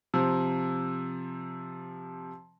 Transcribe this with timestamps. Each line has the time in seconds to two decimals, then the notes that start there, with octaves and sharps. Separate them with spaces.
0.14 C3 F3